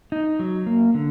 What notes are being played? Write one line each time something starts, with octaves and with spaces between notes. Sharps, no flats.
D#4
F#3
A#3
D3